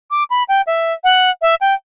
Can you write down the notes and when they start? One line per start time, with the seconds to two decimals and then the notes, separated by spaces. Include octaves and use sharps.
0.11 D6
0.30 B5
0.49 G5
0.67 E5
1.04 F#5
1.42 E5
1.61 G5